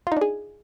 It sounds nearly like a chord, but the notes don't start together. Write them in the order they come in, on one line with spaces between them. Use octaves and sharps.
F4 D#4 D4 G#4